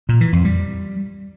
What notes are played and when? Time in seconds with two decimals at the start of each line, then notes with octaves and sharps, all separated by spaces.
0.09 A#2
0.21 E3
0.33 F2
0.45 G3